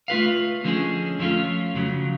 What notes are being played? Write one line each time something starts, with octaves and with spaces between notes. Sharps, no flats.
A3 F4 B4 F5
D3 F3 G#3 C#4 G#4
F2 F3 A3 C#4 F4
F2 C#3 F#3